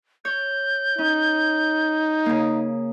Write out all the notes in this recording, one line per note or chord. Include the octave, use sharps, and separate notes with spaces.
C#5 G6
C#4 D#4
C#3 A#3